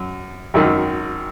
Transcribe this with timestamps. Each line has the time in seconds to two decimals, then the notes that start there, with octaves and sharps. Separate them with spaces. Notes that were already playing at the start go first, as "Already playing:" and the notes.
Already playing: F#2
0.54 G#1 F#2 D#3